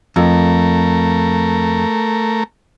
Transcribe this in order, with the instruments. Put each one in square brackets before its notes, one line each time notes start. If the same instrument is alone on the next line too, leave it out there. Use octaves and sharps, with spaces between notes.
[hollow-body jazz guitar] F2 [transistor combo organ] A3 A#4